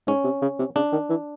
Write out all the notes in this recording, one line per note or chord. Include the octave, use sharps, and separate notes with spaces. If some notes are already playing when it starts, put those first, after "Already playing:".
G#2 C#4
C3
C#3
C3
C#3 D4
D#3
E3